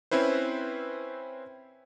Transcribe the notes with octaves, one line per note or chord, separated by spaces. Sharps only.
C4 C#4 E4 B4 C5